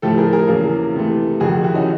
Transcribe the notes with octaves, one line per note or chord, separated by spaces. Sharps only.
A2 F3 A3 G4 A4
G#4 A#4
G#4 A#4
E2 C#3 F#3 A#3
C3 E3 A3
F2 C3 D#3 F#4 G#4
E4 F#4
C#4 D#4